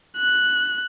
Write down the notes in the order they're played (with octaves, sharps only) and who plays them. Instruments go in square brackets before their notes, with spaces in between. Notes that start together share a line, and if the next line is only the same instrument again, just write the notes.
[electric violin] F#6